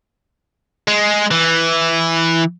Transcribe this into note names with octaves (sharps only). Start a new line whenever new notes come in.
G#3
E3